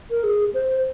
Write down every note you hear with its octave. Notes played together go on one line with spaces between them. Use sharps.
A#4
G#4
C5